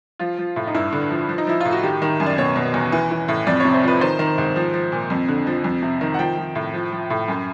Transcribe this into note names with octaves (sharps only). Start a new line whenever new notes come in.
F3 F4
F3
A2
D#4
G2 E4
D3
F3
F3
D#4
F3 E4
A2 F4
F#4
D#3 G4
D#3
F#2
D5
B2 C#5
B2
E2
E3
E3
A2
F2 D5
C3 C#5
C5
F3 B4
D#3 C5
D#3
G#2
F3
F3
A#2
F2
D3
F3
F2
C3
D#3
F#5
F3 G5
F3
A2
F3
F3
A2
F#2